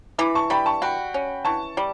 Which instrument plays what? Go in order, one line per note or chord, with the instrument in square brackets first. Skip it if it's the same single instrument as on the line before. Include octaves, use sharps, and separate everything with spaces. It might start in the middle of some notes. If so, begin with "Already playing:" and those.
[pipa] E3 [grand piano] B5 D6
[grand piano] A5 C#6
[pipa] G3 [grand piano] G5 B5
[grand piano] A5 C#6
[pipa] F#4 [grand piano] G5 B5
[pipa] C#4
[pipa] E3 [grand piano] A5 C#6
[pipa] G3